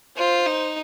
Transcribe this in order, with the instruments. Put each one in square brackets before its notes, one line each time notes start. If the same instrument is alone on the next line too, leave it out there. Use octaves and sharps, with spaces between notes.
[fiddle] F4 [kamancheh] C5
[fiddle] D#4